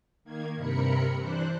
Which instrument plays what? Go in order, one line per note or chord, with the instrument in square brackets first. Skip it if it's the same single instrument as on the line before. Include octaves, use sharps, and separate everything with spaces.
[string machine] D#3 A#3 G#6
G2 C3 A#4 B5 C#7
E3 D4 C5 F#6